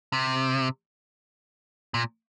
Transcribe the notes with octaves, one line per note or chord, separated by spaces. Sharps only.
C3
A#2